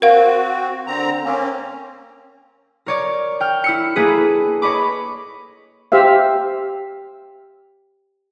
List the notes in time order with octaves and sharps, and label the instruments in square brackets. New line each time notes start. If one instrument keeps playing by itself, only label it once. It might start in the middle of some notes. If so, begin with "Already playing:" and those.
[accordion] C4 F#4 [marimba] A#4 F5
[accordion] D3 C4 A#5
A#3 C4 C#4
[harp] A#4 C#5 D5
G5 F6
E4 E6 C#7
A#3 E4 G#4 A4 B4
C#5 D#5 B5 D6
[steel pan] G4 C5 E5 F5